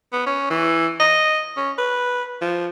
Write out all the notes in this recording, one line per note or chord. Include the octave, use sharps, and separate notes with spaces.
B3
C#4
E3
D#5
C#4
B4
F3